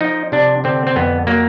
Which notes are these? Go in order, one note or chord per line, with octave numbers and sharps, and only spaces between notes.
F3 D#4
C3 D4
D3 C4
C4
F2 B3
F#3 A#3